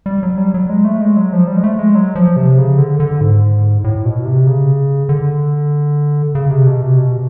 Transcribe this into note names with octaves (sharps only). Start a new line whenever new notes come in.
G3
F#3
G3
F#3
G#3
A3
G#3
F#3
F3
G3
G#3
A3
G#3
F#3
F3
C3
C#3
D3
D3
G#2
A2
B2
C3
C#3
D3
C#3
C3
B2
C3
B2